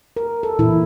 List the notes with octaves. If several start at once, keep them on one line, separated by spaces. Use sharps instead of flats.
A#4
A4
A#2 E3 E4